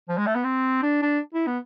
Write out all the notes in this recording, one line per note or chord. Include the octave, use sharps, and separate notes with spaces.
F3
G#3
A3
B3
C4
D4
D4
E4
B3